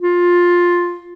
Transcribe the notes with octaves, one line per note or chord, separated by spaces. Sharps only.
F4